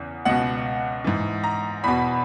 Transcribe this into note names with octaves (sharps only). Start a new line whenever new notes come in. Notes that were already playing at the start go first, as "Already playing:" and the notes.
Already playing: E2 C#3
C#2 B2 F#5
G#2 E3
A#5
E2 B2 B5